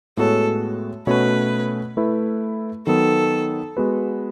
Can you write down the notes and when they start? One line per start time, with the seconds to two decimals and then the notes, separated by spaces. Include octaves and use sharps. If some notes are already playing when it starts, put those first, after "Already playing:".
0.17 A2 G#3 B3 F#4 A4 C#5
1.07 B2 A3 C#4 F#4 B4 C#5
1.97 A3 E4 B4
2.87 D#3 F#3 B3 A4
3.77 G#3 B3 F#4 B4